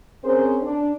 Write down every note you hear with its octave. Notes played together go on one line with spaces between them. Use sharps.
C4 C#4 G#4 A#4 C5
D4